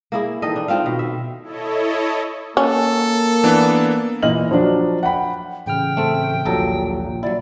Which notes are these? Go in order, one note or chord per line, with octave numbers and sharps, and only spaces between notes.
A#3 E4 G#4
D#3 E3 A4 D#5
D4
D#3 C4 F4 F5
B2
E5
E4 A4 C#5 D#5
A#3 C#4 A4
E3 B3 D4
A#2 E3 D#5 F6 F#7
F3 F#3 D4
F#5 G5 B5
A1 C#3 G5 F6
A3 C4 A4
A#1 D#2 A#2 F#3 A4 A#5
A#2
F#3 E4 D5